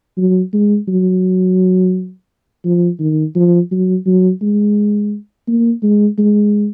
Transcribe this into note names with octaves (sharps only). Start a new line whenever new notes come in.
F#3
G#3
F#3
F3
D#3
F3
F#3
F#3
G#3
A#3
G#3
G#3